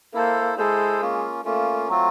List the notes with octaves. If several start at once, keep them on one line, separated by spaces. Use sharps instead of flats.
A#3 E4 A4 C5
G#3 E4 A4 C5
A#3 C#4 F4
A3 A#3 C#4 F4
F#3 A3 C4 F4